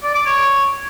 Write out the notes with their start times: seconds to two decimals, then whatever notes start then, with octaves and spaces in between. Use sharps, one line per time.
0.03 D5
0.15 D6
0.26 C#5